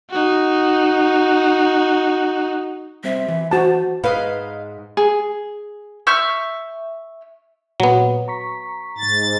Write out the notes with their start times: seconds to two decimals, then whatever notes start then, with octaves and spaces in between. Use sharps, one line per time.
0.10 D#4 F#4
3.04 G3 C4 E5
3.28 E3 B5
3.51 F#4 C5 A5
4.04 G#2 B4 D#5 F5
4.97 G#4
6.07 E5 C#6 F6 G6
7.80 A#2 F#3 B3 F#4
8.28 A#5 C#6 B6
8.98 G#2 A6